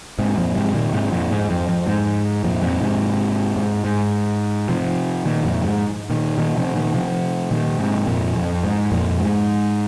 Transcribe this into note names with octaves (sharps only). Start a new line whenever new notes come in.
G#2 C3
F2 A#2
G#2 C3
A#2 D#3
G#2 C3
F2 A#2
G#2
F2
F2
G#2
F2 A#2
F2 A#2
G#2 C3
G#2
G#2
C3 F3
A#2 D#3
F2 A#2
G#2
A#2 D#3
A#2 D#3
C3 F3
A#2 D#3
C3 F3
A#2 D#3
G#2 C3
F2 A#2
F2
G#2
F2 A#2
G#2